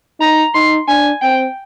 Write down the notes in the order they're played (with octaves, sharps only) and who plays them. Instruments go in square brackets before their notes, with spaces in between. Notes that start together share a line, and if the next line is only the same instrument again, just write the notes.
[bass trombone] D#4 [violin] A#5
[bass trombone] D#4 [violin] C6
[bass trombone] D4 [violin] G#5
[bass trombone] C4 [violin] G5